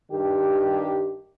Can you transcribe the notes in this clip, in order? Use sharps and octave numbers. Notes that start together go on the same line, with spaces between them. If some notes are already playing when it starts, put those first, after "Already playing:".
G2 D#3 G4